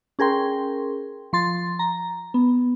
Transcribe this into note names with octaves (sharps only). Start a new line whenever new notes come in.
C#4 G#4 A#4 G5 C6
F3 C6 A6
A#5
B3